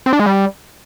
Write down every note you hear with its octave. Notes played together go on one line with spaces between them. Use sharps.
C4
D4
G#3
G3